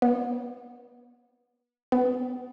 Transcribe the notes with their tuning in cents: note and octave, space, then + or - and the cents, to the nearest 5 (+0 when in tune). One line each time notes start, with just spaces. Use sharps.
B3 -30
B3 +20